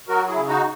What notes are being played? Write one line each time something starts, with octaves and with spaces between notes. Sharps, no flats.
F#3 F#4 A#4
E4 G#4
C#3
D#4 F#4